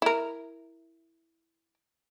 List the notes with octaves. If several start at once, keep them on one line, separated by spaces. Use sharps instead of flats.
E4 A#4